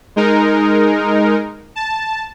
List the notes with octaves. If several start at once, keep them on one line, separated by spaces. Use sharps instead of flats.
G#3 D#4 A#4
A5